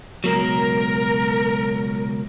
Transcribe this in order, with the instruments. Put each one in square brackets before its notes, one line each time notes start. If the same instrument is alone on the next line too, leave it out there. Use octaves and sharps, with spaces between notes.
[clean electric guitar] C#2 B2 F#3 [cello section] A#4